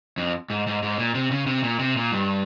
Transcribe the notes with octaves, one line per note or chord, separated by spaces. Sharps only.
F2
G#2
G#2
G#2
A#2
C3
C#3
C3
A#2
C3
A#2
G2